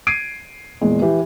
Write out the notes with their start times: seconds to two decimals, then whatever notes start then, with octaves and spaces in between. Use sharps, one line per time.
0.07 G#6 C7 D7 D#7
0.81 E2 A#2 G#3
1.02 E3 G4